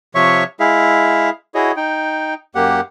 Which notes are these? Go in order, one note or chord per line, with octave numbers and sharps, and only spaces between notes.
C3 F3 C#5 E5 C#6
G#3 E4 G#4 E5 F5
E4 F#4 G#4 C#5 D#5
D#4 G5
F#2 A#3 G4 F#5